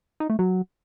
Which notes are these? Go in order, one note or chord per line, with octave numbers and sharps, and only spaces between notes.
D#4
A3
F#3